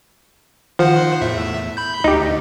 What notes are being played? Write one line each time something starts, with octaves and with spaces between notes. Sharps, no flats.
D#3 F3 C5 F#5
E2 A2 E5
B5 G6
D2 D#4 G4